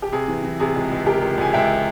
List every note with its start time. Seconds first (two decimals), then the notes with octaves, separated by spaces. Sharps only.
0.02 G4
0.12 C3 G#4
0.28 E3
0.43 E3
0.59 C3 G#4
0.75 C#2
0.91 C#2
1.06 C3 G4 A#4
1.21 C#2
1.38 C#2 G#5
1.53 C#2 E5 G5